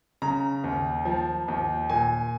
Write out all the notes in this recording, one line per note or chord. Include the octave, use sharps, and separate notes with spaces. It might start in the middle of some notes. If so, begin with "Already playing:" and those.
C#3 A#5
D#2
F3
D#2
A#2 G#5